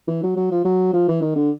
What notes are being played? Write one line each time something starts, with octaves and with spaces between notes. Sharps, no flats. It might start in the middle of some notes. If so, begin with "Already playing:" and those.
E3
F#3
F#3
F3
F#3
F3
E3
D#3
D3